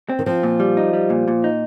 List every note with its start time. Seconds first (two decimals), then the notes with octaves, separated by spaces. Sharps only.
0.09 C4
0.19 D#3
0.26 F3 C4
0.43 A#2
0.60 G3
0.77 D#4
0.94 G3
1.10 A#2
1.28 A#2
1.44 D#4